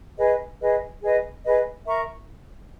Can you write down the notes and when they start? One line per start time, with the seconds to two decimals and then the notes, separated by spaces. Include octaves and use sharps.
0.17 G#4 B4 D#5
0.60 G#4 B4 D#5
1.02 G#4 B4 D#5
1.44 G#4 B4 D#5
1.86 A#4 E5 A#5 C#6